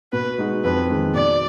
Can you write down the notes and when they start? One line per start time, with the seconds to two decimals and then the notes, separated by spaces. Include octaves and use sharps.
0.12 B2 B4
0.38 G#3 D#4 F#4
0.64 F2 B4
0.90 D#3 G#3
1.14 B2 D5